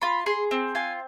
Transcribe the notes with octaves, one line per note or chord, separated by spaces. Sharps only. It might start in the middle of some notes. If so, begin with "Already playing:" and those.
F4 B5
G#4 C6
C4
F4 G#5